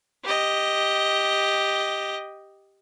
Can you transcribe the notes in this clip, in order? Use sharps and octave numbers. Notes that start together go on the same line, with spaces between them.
G4 D#5